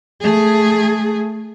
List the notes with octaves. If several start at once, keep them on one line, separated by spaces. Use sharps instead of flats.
A3 G#4